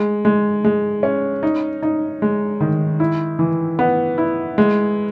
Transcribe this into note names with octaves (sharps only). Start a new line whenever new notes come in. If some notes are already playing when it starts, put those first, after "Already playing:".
Already playing: G#3
G#3
G#3
C#4
D#4
D#4
G#3
D#3
E4
E3
B3
E4
G#3